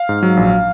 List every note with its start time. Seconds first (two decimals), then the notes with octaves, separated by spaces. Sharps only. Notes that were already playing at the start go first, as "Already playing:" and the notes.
Already playing: F5
0.09 G#2
0.23 F#3
0.37 A#1